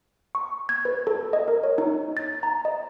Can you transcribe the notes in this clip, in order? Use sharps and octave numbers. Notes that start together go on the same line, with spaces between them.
C#6
G#6
B4
A4
D#5
A#4
C#5
D#4
A6
A#5
D#5